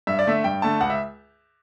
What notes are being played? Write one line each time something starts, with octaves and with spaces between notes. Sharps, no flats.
G2 E5
D5
D3 A3 E5
G2 G5
D3 A3 A5
C#2 F#5
E5